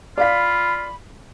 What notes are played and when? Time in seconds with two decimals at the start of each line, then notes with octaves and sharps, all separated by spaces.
0.18 F4 D5 F5 B5 B6